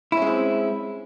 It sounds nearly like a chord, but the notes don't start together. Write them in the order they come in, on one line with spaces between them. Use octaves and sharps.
E4 C#4 G#3 C4